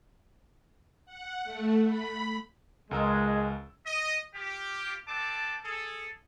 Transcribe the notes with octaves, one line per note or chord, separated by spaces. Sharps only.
F#5
A3
B5
C#2 G#3 A#4 E6
D#5
F4 G4
C4 D4 A4 A5 D6
G#4 A4